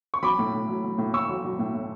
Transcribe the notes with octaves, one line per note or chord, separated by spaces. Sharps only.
C#6
F#3 B5 D6
A2
A2
F#3
F#3
A2
A2 C#6 E6
F#3
F#3
A2
A2